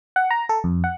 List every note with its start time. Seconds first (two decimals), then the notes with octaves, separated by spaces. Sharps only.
0.16 F#5
0.31 A#5
0.49 A4
0.64 F2
0.84 F#5